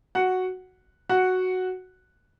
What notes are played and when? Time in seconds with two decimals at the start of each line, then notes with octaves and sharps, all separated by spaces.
0.15 F#4 F#5
1.09 F#4 F#5